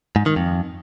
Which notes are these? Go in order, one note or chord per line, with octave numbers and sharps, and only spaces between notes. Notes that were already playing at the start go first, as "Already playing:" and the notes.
G#2
D#3
F2